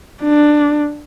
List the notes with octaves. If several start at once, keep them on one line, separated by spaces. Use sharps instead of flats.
D4